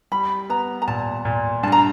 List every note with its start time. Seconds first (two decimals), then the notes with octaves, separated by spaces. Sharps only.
0.12 G3 B5
0.49 B3 A#5
0.82 A#5
0.88 A#2 A5
1.25 A#2
1.63 G2 A5
1.72 A#5